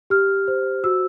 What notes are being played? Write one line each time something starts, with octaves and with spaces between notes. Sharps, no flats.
G4 F6
C5
F#4 E6